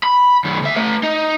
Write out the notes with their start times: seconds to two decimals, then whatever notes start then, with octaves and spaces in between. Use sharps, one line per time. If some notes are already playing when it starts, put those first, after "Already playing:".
0.03 B5
0.44 F#2 D#3
0.62 D2 E5
0.76 A3 B4
1.03 D#4